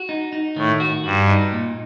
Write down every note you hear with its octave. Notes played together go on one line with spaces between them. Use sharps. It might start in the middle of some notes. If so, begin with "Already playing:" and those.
Already playing: F#4
D#4
D#4
A2 D#3
F#4
G2 F#4
D#4
A#2